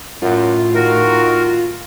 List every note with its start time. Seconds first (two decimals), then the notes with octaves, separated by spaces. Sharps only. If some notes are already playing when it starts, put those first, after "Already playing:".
0.22 F#2 A2 F4
0.74 D#3 F#4 A#4